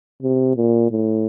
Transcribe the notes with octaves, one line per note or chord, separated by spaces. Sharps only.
C3
A#2
A2